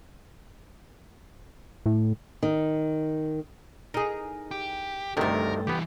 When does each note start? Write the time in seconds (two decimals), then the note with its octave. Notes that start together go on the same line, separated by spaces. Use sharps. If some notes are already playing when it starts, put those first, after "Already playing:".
1.86 A2
2.43 D#3
3.94 D#4 G#4 A#4
4.51 G4
5.17 D2 G2 C3 D#3 A3 A#4
5.67 E3 G3 B3 G4